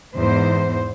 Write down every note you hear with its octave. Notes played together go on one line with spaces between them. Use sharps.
E2 G#2 C5